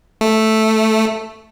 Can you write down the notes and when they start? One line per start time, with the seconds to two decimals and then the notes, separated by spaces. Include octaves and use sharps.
0.21 A3